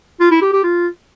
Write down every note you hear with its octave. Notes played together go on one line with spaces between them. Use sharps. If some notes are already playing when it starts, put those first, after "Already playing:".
F4
E4
G4
G4
F4